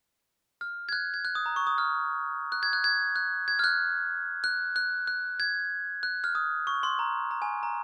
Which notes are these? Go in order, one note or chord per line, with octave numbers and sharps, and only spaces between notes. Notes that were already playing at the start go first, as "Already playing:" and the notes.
F6
G#6
F#6
G#6
F#6
D#6
A#5
C#6
D#6
F6
F#6
G#6
F#6
G#6
F#6
G#6
F6
F#6
F#6
F#6
F#6
G#6
F#6
F6
D#6
C#6
C6
A#5
A#5
G#5
A#5